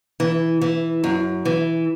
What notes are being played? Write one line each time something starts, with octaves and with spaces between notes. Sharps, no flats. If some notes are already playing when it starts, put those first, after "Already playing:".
E3
E3
F#2
E3